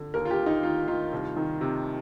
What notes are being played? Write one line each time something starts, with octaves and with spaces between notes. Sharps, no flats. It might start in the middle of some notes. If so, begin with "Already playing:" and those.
Already playing: D3
D#2 A#4
F4
G4
D#2
D#4
D#3 F4
D#3 F4
C2
D#3
C3